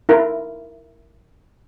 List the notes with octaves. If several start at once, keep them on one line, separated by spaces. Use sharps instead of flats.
E4 A#4